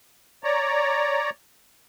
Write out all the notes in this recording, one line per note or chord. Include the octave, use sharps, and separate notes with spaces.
C#5 D5 A#5